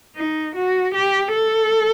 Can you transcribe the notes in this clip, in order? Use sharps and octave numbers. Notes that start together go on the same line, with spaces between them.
D#4
F#4
G4
A4